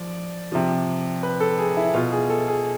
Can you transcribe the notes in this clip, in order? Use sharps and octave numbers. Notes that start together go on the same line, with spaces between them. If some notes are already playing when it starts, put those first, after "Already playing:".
Already playing: F3 D5
C3 F3
B4
A4
G#4
E4
B2 F4
G#4
A4
G#4